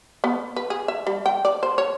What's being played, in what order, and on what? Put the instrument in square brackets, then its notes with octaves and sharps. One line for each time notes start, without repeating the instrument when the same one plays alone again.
[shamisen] B3
B4
G#4
E5
G3
G5
D5
C5
C#5